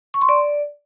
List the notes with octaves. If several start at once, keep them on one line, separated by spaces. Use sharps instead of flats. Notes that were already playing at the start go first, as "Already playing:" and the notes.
C#6
C6
D5